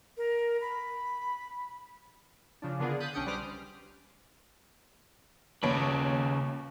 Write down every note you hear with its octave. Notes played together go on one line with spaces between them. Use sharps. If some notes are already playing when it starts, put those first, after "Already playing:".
A#4
B5
C#3 F3 D4
D3 A#3 B3 D4 F4 G#4
D#6 F#6 G6 A6 B6
B1 C#4 D4 G5 D#6 C#7
G3 B4 C5 D6 D#6 F6
D#2 C#3 B4 C#5 D7